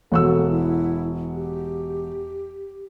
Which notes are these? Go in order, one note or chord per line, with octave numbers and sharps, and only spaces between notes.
E1 F#4 A4 E6
E4
G4